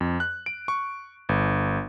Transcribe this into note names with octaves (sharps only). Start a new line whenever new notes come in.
F2
F#6
D7
C#6
G1